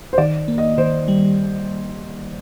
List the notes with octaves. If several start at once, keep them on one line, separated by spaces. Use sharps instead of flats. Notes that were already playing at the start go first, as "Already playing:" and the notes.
C5
D#3 D5
A#3
D#5
D#3 C5
G3